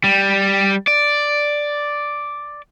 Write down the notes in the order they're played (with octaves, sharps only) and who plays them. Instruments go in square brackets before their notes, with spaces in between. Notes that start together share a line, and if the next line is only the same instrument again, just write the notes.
[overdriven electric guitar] G3
D5